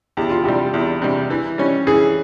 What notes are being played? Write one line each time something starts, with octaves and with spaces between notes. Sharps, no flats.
E2 G4
F4
C3 G3 G4
E2
C3 G3
E3
G3 C#4
E3 G#4